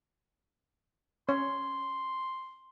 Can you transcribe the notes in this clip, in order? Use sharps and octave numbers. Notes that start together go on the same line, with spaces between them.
C#4 C#5 C6